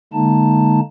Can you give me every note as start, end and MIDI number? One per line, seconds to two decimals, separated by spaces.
0.13 0.80 50
0.13 0.80 56
0.13 0.80 58
0.13 0.80 63
0.13 0.80 81